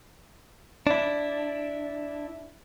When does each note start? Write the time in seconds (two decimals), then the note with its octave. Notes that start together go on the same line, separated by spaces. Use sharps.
0.87 D4 E4